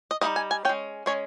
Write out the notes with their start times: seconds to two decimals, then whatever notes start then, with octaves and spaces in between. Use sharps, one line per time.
0.11 D#5
0.21 G3 A#3 D#4 D#5
0.36 G#5
0.51 G#5
0.65 C#4 G5
0.69 G#3
1.06 G#3 C#4 C#5